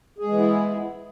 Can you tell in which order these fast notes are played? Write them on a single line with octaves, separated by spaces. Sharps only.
G#4 G#3 E3 B3 E4